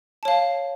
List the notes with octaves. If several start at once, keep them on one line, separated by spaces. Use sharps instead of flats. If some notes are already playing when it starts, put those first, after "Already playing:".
C#5 F5 A5